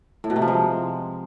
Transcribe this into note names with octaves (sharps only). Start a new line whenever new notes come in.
A2
B2
C3
F3
G#3